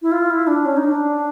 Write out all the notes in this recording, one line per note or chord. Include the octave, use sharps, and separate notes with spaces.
E4
F4
E4
D4
C#4
D#4
D4